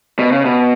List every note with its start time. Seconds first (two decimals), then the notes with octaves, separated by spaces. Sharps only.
0.19 B2
0.32 C#3
0.45 B2